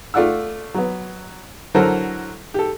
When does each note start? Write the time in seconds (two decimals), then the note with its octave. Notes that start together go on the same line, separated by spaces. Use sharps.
0.14 A3 F4 D5 F#5 E6
0.74 F#3 B3
1.74 D3 F#3 E4 A4 A#4 C5
2.54 G4 A4